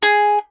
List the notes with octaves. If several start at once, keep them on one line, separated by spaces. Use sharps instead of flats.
G#4